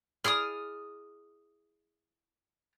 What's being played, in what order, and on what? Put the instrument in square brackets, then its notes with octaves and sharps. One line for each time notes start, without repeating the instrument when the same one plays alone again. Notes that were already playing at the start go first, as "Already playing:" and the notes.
[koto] E4 G#4 D5 [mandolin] D#6 F6